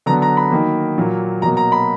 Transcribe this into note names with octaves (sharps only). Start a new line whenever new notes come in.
D3 F#3 B3 A#5
A#5
B5
D#3 F#3 A#3
A#2 F#3 A#3
B2 F#3 A#3 A#5
A#5
B5